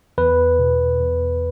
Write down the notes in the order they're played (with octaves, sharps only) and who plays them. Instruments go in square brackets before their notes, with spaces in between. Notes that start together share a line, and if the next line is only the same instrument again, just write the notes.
[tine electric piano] E2 B4
B2
E2